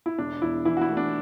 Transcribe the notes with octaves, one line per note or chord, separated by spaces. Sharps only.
E4
E1 D4
E2 E4
E3 E4
F#4
E4
A3
D4